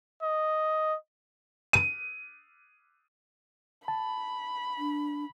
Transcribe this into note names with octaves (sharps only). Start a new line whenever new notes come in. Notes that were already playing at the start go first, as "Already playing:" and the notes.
D#5
D#7
A5 B5
D4